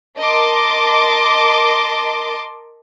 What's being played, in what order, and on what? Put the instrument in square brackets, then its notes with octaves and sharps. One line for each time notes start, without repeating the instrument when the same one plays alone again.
[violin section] A#4 D#5 A5 C6 D6